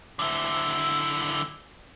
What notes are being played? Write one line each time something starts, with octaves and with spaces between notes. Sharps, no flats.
D3 E4